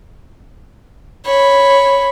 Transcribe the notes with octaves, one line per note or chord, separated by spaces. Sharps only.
C#5 B5